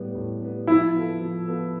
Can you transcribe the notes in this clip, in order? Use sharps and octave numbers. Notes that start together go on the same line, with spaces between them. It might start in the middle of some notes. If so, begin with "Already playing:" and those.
Already playing: A2 G3 B3
A2
G3 B3
F3 E4
B3 F4 A4
F3
B3 F4 A4